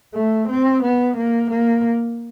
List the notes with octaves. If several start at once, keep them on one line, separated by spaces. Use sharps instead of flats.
A3
C4
B3
A#3
A#3